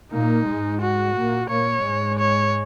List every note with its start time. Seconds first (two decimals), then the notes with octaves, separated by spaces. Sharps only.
0.12 A#2 A#3 D#4
0.47 G#2 G#3
0.82 F#4
1.15 A#2 A#3
1.50 A#2 A#3 C#5
1.85 G#2 G#3
2.19 C#5